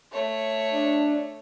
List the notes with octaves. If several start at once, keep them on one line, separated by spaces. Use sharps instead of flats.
A3 C#5
D4